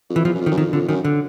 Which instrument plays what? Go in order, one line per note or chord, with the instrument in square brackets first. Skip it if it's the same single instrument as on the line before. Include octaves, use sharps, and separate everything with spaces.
[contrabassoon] F2
[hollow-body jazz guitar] E3
[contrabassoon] E2 [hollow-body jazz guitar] F3
[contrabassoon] F#2
F2
[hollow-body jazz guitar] D#3
[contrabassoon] F#2
[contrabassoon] F2 [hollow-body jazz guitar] D#3
[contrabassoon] F2 [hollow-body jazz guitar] D3
[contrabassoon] F#2 [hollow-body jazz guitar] D#3
[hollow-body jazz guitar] D3